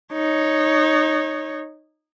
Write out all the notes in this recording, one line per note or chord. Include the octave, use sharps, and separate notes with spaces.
D#4 C#5